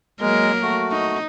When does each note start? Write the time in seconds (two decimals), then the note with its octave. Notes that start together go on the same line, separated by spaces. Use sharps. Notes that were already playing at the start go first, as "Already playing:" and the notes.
0.21 F#3 G#3 A#3 A#4
0.62 A3 F#4
0.92 D#4